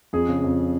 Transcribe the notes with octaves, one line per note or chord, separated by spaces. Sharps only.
F2 G#4
C#3
F2